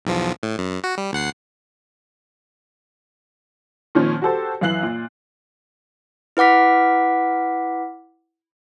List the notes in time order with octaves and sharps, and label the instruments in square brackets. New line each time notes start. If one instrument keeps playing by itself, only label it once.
[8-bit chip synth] B1 E2 F3
A2
F#2
F#4
G3
D2 F#5 C7
[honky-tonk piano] A#2 D#3 F3 C4 C#4
F#4 G4 A4 C5
F#2 E3 F5 F#6 C7 F#7
A#2
[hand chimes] E4 B4 F#5 D6 B6